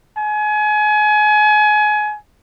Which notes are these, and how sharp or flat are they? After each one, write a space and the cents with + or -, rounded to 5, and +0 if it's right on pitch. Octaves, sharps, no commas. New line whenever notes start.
G#5 +30